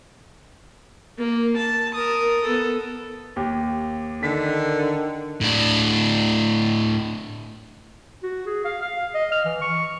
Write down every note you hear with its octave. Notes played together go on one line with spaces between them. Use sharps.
A#3
A5
A#4 D#6
B3 A4
D#2 G4
D3 D#3 B6
A2 D4
F#4
G#4
F5
F5
D#5
F6
E3
C#6